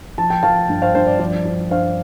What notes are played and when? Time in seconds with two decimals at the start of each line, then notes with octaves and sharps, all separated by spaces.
0.18 F3 A5
0.30 G5
0.43 F3 F5 A5
0.69 G2
0.82 C5 F5
0.95 G2 C5
1.07 D5
1.19 F3 D5
1.45 F3
1.71 G2 C5 F5